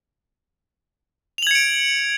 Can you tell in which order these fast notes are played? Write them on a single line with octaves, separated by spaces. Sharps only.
F7 F#7 G#6 C#7 D7